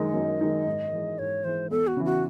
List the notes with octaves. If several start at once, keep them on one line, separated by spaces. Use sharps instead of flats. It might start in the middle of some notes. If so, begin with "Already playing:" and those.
Already playing: F#2 D#3 G#3 D#4 D#5
F#2
D#3 G#3 D#4
G#2
E3 G#3
G#2 C#5
E3 G#3 C5
E2 A4
F#4
C#3 E3
F#4